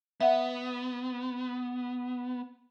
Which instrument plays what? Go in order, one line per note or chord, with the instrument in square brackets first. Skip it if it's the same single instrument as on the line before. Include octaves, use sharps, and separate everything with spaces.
[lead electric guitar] B3 [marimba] E5 F#5